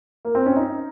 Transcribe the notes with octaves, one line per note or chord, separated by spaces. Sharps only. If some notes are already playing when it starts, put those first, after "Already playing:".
A#3
C4
C#4
D#4